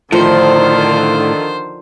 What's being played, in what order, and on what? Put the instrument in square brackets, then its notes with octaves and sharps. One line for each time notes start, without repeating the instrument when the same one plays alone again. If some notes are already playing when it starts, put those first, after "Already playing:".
[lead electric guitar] A2 [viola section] D3 D#3 F4 [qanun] F3 [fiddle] C5